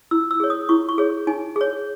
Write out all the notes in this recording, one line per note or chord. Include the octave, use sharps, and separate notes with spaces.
E4 E6
E6
G#4 C#5
D#6
E4 C#6
C#6
G#4 C#5
D#4 G#5
G#4 C#5